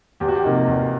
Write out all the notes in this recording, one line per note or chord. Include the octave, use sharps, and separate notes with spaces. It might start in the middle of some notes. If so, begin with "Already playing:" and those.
E2 G4
F#4
G4
C3 F3 A#3 D#4
E2